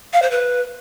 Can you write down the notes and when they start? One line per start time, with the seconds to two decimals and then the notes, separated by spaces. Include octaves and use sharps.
0.13 F5
0.22 C5
0.31 B4